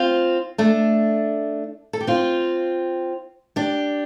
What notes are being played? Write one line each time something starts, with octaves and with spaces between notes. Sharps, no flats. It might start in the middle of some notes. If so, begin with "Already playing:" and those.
Already playing: C4 F4
A3 D4
A4
G4
C4 F4
D4 G4